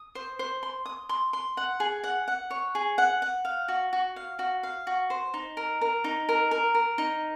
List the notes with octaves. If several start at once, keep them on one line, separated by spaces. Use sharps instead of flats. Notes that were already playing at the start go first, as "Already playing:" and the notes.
Already playing: D#6
C5
C5
C6
D#6
C6
C6
F#5
G#4
F#5
F#5
C#5
G#4
F#5
F#5
F5
F#4
F#4
F5
F#4
F5
F#4
C5
D#4
A#4
A#4
D#4
A#4
A#4
A#4
D#4